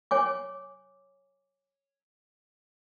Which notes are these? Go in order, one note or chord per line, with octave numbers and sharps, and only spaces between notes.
C#5 G#5 D6